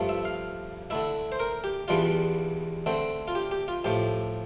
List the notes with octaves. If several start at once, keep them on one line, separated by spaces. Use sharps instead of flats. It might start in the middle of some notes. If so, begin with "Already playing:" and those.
Already playing: G2 F3 A3
E5
F5
D3 A3 E4 E5
C5
A#4
G4
E2 E3 G3 D4 F4
D3 A3 C4
F4
G4
G4
F4
A2 F3 A3 G4